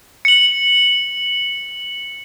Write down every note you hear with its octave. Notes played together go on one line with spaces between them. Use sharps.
C#7 F#7